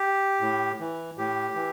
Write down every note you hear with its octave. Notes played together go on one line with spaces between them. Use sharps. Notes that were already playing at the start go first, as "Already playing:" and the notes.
Already playing: G4
A2
E3
A2 G4
E3